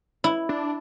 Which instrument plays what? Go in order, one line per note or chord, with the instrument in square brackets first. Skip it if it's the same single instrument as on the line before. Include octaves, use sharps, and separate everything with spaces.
[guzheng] E4
[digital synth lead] D4